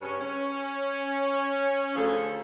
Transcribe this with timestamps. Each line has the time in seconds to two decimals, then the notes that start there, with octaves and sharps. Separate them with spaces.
0.02 G2 C#3 C#4
0.20 C#4
1.95 D2 F3 G#4 A4